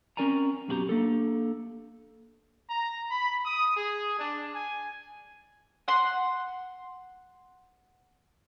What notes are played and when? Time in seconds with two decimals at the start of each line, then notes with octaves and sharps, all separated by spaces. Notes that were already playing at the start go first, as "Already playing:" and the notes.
0.17 C4 C#4 A#4 D5 G#5 A#5
0.68 F#2 B2 F#4 G4 A#5
0.89 A#3 D4 A4
2.70 A#5
3.11 B5
3.45 D#6
3.76 G#4
4.19 D4
4.55 G#5
5.88 F#5 C6